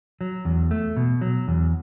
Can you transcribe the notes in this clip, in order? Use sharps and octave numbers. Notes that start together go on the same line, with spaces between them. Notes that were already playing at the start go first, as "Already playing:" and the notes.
F#3
E2
A3
B2
F#3
E2